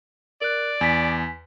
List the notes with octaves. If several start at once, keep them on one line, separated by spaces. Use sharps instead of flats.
A#4 D5 F#6
E2 G#5 B6